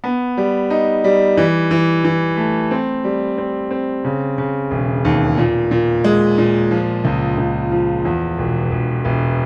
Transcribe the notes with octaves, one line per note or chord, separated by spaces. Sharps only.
B3
G3
D#4
G3
E3
E3
E3
A3
C4
G3
C4
C4
C#3
C#3
E1
D#2
A#2
A#2
G#3
A#2
F3
C#2
C#2
F3
E2
E1
E1
E1